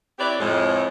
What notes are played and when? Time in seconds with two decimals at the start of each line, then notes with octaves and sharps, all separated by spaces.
0.19 C4 E4 G4 B4 C#5 D5
0.40 F2 A2 G#3